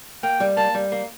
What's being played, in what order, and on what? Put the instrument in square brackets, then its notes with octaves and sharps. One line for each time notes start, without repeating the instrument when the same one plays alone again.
[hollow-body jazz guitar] A#3 [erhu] G5
[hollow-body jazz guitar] G3
[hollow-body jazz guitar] A#3 [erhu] A5
[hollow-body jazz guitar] G3
A#3